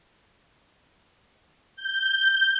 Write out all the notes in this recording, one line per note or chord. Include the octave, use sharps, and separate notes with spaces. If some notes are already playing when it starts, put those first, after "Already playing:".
G6